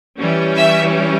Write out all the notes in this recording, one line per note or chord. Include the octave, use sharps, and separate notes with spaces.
E3 G3 C#4
E5